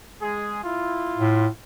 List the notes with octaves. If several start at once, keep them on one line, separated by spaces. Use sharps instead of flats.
G#3 G#4
E4 F4
A2